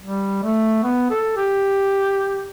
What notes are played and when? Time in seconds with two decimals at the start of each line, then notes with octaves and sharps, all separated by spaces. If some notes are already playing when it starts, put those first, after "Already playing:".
0.03 G3
0.43 A3
0.83 B3
1.10 A4
1.36 G4